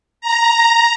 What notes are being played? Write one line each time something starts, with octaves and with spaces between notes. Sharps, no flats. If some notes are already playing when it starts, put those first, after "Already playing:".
A#5